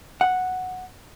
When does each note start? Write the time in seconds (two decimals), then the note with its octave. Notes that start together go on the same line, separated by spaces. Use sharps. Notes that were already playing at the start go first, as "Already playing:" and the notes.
0.21 F#5